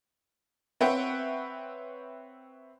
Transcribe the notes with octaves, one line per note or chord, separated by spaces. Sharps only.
C4 B4 C#5 E5 F#5 G5